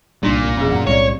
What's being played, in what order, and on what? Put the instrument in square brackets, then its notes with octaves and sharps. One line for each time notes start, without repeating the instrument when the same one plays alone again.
[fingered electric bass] C2 G3 [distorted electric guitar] A#2 [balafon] D4 D#4
[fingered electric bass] C2
[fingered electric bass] E1 [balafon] C#4 G#4
[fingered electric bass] F#2 C#4 [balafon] F#5 A#5
[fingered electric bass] B1 A2 G3 [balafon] G#3 C4 D5 [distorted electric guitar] C#5